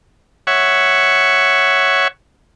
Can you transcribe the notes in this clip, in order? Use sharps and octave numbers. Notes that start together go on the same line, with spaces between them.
C#5 E5 F#5 C#6